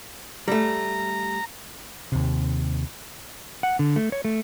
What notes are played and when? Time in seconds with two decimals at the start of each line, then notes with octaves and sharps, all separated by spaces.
0.48 G3 A3 A#5
2.12 D#2 C3
3.63 F#5
3.79 D3
3.96 A3
4.12 C#5
4.25 A3